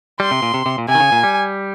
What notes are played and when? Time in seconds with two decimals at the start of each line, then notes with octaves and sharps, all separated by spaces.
0.20 G3 C6
0.31 C3
0.42 A#2
0.54 C3
0.66 C3
0.78 A#2
0.88 C3 G#5
0.95 D#3
1.00 C#3
1.12 A#2
1.23 G3